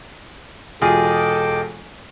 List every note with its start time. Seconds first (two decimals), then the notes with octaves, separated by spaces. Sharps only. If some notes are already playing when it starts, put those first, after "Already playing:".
0.82 E1 F4 G#4 A4 D#5 G5 D6